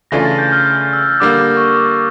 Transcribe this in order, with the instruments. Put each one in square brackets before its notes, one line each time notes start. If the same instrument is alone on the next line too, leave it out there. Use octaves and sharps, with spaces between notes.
[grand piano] C#3 E3 A3 D4 F4 [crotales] A#6
[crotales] A6
G6
F6
F6
E6
[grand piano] D3 G3 A#3 [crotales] D6
[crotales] D6
C#6
D6